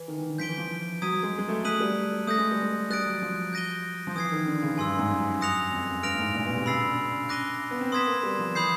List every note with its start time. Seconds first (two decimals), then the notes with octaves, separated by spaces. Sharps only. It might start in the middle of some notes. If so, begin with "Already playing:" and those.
Already playing: E3
0.08 D#3
0.18 E3
0.28 D3
0.38 F3 G6 B6 D7 G7
0.49 E3
0.58 F3
1.02 F#3 D#6 G#6 B6 D#7
1.12 F#3
1.23 G#3
1.38 G#3
1.49 A3
1.64 A3 D#6 F#6 B6 D#7 F#7
1.80 G3
2.27 A3 D#6 G6 A#6
2.38 G#3
2.51 G3
2.62 G#3
2.90 G3 D#6 F#6 A6 D7
3.06 F#3
3.22 F3
3.53 G6 A#6 D#7 G7
4.07 F3
4.15 E3 D#6 G#6 C7
4.32 D#3
4.47 D3
4.63 C#3
4.78 G2 G#5 C6 E6
4.99 G#2
5.10 F#2
5.41 D#6 F#6 A#6 C#7 F7
5.72 F2
5.89 F#2
6.03 G2 F6 A#6 D7 F7
6.14 A2
6.20 G#2
6.35 A#2
6.46 B2
6.56 C3
6.66 C#3 B5 E6 A6 C7
6.82 D3
7.29 D6 F#6 A#6 D#7 G7
7.71 B3
7.81 C4
7.92 B3 C6 D#6 G#6 B6 E7
8.07 A#3
8.23 G3
8.39 F3
8.55 E3 B5 D#6 G6 C7